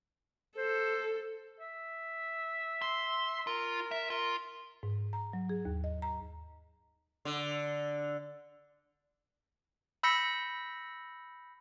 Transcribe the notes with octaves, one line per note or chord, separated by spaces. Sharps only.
A4 C5
E5
C6
F4 A#4
E5
F4 A#4
G#2
A#5
F#3
G#4
D#2
D#5
A#5
D3
B5 E6 G6 A#6 B6 C#7